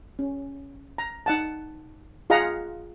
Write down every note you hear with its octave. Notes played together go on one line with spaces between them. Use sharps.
C#4
A#5
D#4 F#5 A5
F4 G#4 D#5 F5 F#5 A#5